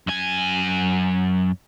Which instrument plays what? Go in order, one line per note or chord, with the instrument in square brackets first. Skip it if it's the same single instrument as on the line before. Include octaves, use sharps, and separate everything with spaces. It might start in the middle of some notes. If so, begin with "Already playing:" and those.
[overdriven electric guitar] F#2 G#5